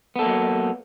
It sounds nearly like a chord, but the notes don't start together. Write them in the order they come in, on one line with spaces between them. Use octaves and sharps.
B3 A4 A#3 F#3